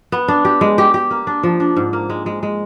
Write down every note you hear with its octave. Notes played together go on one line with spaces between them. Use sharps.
B3
D4
G4
G#3
G4
G4
A#3
D4
F3
D4
G#2
A#3
G#3
G#3
G#3